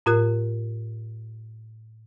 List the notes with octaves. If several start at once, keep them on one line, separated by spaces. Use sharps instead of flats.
A2 F4 A#4 F#6